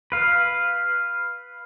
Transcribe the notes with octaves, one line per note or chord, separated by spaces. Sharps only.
B4 F5